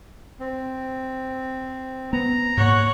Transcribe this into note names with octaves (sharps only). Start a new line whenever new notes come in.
C4
B3 A#5
G#2 A#3 C#5 F#5